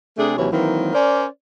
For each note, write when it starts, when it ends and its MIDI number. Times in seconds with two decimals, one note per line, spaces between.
0.18 0.36 48
0.18 0.36 57
0.18 0.36 62
0.18 0.36 68
0.37 0.48 39
0.37 0.48 48
0.37 0.48 52
0.37 0.48 54
0.37 0.48 73
0.51 0.89 51
0.51 0.89 52
0.51 0.89 54
0.51 0.89 58
0.51 0.89 60
0.93 1.25 61
0.93 1.25 70
0.93 1.25 72
0.93 1.25 74